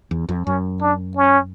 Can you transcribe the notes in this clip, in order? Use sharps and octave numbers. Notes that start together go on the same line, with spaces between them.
E2
F2
F#2 C#4
D4
C#4